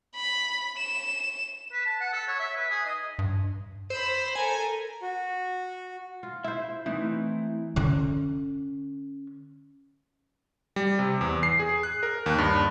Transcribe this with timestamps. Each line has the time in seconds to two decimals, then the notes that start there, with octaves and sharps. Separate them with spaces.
0.15 B5
0.78 E7
1.72 B4
1.86 A5
2.01 F#5
2.13 A4
2.28 C#5
2.39 E5
2.57 B4
2.70 G#4
2.85 D#5
3.19 G2
3.90 C5 B5 E6
4.35 A4 A#4 G#5
5.02 F#4
6.23 F4
6.44 E4 C5 E5
6.86 E3 A3 C4 D#4 E4
7.76 D3 C#4
10.76 G3
10.99 C3
11.21 E2
11.43 C7
11.60 G#4
11.83 F#6
12.03 A#4
12.26 D#2
12.38 G2